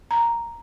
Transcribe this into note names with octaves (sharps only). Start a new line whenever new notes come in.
A#5